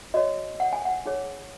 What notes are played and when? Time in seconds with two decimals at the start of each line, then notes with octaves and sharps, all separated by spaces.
0.14 F#4 C#5 D#5
0.60 F#5
0.73 G#5
0.85 F#5
1.06 D#4 G#4 C#5